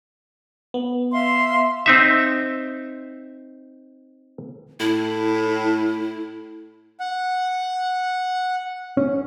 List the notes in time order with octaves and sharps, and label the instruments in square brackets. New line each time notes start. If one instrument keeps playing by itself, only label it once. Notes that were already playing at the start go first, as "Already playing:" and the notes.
[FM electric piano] B3
[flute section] E5 F5 C6
[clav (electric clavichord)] C4 D#4 E5
[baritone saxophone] A2 [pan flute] E4
[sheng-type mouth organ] F#5
[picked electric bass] C#4